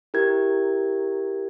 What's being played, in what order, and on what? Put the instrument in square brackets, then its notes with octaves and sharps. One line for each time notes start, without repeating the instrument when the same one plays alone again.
[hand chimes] E4 G4 A#4 G#6